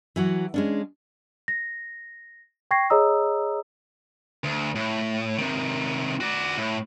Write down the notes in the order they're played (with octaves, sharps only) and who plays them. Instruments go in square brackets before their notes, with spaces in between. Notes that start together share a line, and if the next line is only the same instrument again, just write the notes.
[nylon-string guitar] E3 F#3 F#4
G#3 C#4 D4
[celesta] A#6
G5 C#6 G#6 A#6 C7
G#4 C#5 D#5 A#5 D#6 E6
[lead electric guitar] D2
A2
C3 D#3
F#4 D5
A2